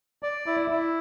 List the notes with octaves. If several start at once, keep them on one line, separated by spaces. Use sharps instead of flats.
D5
E4
E4